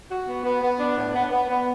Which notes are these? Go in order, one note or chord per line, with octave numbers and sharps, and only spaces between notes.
F#4
B3
B3
B3
D4
A2
B3
B3
B3